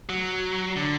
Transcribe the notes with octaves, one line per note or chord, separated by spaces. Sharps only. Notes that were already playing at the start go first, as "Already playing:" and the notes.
F#3
D3